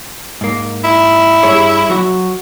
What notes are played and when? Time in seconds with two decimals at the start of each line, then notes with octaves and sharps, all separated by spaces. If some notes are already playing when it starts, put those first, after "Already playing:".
0.41 G#2 A#3
0.84 E4
1.43 G2 G#4 C#5
1.90 F#3 F#4